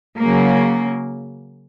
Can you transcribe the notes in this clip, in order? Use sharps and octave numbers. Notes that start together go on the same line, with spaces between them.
C#3 F#3 A#3